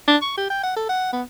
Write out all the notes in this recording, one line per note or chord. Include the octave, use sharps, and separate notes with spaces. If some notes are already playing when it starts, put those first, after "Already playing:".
D4
C#6
G4
G5
F#5
A4
F#5
B3